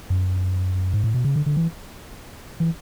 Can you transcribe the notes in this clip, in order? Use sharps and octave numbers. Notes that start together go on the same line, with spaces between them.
F#2
G#2
A2
B2
C#3
D3
D3
E3
E3